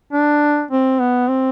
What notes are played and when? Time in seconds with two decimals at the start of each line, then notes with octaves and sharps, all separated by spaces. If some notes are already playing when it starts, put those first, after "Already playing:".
0.12 D4
0.71 C4
1.00 B3
1.28 C4